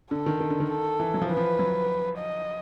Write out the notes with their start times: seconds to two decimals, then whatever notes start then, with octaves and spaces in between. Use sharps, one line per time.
0.11 D3 A4
0.26 D#3
0.40 D#3
0.50 D3
0.60 D#3
0.70 A4
1.00 E3
1.14 F#3
1.22 F3
1.29 E3 B4
1.37 F3
1.59 F#3
2.18 D#5